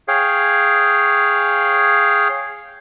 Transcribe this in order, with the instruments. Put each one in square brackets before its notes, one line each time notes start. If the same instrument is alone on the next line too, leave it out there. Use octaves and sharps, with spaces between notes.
[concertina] G#4 C#5 F5 G5